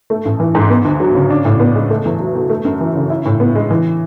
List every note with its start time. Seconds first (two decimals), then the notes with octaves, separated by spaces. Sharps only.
0.10 A3
0.25 A1
0.40 E3
0.55 G#2
0.70 B3
0.85 D2
1.00 F#3
1.15 C#3
1.30 D4
1.45 A2
1.60 B3
1.75 G#3
1.90 A3
2.05 E2
2.20 F#3
2.35 B2
2.50 A3
2.65 F#2
2.80 E3
2.95 C#3
3.10 E4
3.25 A2
3.40 B3
3.55 G#3
3.71 E3